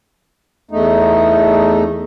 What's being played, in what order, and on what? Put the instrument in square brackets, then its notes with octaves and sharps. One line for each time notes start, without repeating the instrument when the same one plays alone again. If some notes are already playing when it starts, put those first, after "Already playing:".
[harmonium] E2 A3 D#4